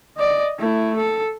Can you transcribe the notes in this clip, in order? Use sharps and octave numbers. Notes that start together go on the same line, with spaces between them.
D5 D#5
A3 E4
A4